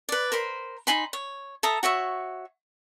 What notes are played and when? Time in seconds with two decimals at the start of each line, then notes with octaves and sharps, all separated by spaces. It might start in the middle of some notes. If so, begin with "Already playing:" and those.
0.09 B4 D5
0.32 A#4 C5 B5 C6
0.87 D#4 G#5 B5 C6
1.13 C#5
1.63 A4 E5 A#5 D#6
1.83 F#4 C#5 E5 C#6